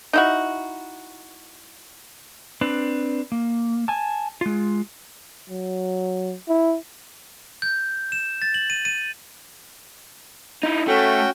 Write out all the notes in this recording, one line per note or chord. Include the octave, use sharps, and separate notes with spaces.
D#4 E4 F#4
C4 D4 B4
A#3
G#5 A5
G#3 F4
F#3
E4
G6
E7
A6
F#7
D#7
D#7
D#4 E4
A3 C#4 F#4 G5